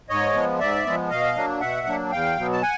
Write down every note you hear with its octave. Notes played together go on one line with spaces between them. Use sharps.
G#2 C#5 D#5
F3 G#3 B3
G#2 D5 E5
F3 G#3 B3
B2 D#5 F5
F#3 A#3 D4
B2 E5 F#5
F#3 A#3 D4
E2 F5 G5
B2 F#3 B3
A5
F#5 G#5